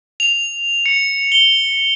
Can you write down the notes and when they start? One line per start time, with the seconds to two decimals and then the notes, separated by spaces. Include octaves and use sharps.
0.20 F7
0.86 C#7
1.32 G7